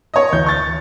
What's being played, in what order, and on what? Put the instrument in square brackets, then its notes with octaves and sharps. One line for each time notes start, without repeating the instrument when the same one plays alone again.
[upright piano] C#5 D#5
[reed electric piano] D2 E3 [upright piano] G6
[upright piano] C#6 A6